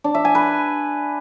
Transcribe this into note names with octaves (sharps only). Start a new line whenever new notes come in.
D4
E5
G#5
B4